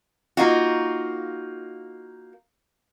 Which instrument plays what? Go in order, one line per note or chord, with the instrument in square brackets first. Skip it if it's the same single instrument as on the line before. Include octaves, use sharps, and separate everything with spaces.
[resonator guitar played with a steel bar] A#3 D#4 F4 F#4